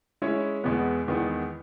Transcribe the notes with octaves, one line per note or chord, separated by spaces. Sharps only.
G#3 C#4 E4 G#4 C#5
E2 B2 G#3 B3
E2 D#3 G#3 B3